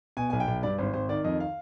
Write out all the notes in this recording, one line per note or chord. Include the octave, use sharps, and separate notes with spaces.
B2 G#5
B1 G#5
G5
B1
G2 D5
G#1 C5
G#1 C5
D#3 D5
F2 D#5
F5